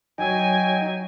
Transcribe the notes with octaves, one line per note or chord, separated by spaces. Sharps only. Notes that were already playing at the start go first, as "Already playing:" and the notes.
F#3 D#4 D#5 G5 G#5